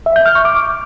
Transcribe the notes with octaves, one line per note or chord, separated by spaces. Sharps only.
E5
G6
F6
C#6
D6